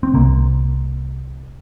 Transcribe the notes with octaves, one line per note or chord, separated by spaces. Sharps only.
C4
C2 C3 A#3